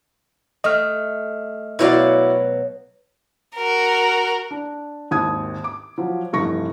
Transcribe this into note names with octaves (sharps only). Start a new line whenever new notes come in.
A3 D#5 F6
B2 F#3 E4 F#4 D5 F5
F#4 A#4
D4
G#1 D#2 D#6 G#6
D6
F3 F#3
F1 G2 E3 C#6 A#6